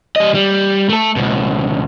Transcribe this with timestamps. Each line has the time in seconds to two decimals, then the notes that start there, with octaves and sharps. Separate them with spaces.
0.16 G3 D#5
0.34 G3
0.89 A3 A4
1.16 C#2 B2